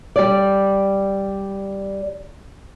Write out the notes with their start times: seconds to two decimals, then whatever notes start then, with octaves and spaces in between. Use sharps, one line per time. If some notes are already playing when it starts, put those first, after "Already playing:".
0.16 G3 D5